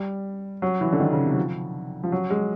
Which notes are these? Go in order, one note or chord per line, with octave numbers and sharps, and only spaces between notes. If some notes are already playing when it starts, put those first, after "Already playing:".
Already playing: G3
F#3
E3
D3
D#3
C#3
C3
F#3
F3
F3
F#3
G#3